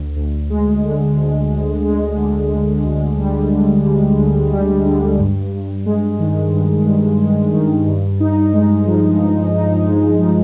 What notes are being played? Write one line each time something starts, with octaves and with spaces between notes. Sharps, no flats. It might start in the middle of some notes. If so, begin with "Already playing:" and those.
Already playing: D2
D2
G#3
D3
D2
D2
G#3
D3
D2
D2
G3
D3
D2
D2
G3
D3
G2
G2
G#3
D#3
G2
G2
G#3
D#3
G2
D#4
G#3
F3
G2
D#4
G#3
F3